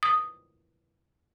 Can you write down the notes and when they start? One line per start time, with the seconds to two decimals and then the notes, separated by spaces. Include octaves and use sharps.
0.03 D#6